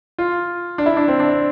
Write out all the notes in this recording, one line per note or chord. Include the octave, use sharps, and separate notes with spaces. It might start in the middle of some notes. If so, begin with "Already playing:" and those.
F4
D4
E4
D4
C4
D4